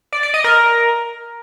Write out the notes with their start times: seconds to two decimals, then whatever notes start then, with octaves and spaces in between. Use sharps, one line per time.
0.13 D5
0.23 D5
0.34 D#5
0.44 A#4